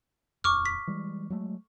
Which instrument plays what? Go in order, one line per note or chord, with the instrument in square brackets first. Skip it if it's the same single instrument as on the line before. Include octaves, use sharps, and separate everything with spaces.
[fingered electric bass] D#1 F2 [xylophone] C#6 D6 F6
[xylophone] B6
[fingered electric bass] E3 G3 G#3
F#3 G#3 A3